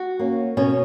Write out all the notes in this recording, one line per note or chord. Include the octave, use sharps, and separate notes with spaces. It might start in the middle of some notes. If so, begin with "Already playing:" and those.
Already playing: F#4
A#3 C#4
B2 C#4